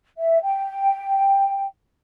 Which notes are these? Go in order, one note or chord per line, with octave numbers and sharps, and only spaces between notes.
E5
G5